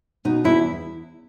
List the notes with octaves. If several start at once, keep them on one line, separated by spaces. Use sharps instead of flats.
B2 D#4
E2 E4